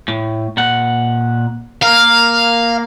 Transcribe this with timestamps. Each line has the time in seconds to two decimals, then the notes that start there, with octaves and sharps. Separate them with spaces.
0.08 A2
0.57 A#2 F#5
1.83 A#3 A#4 F5